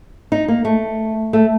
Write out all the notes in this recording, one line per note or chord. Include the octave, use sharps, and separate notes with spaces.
D#4
A#3
A3
A3